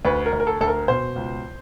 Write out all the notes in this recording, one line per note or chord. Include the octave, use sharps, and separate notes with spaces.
D2 B4
A#4
D2
A#4
A4
D2 A4
A#4
B2 C5
C#2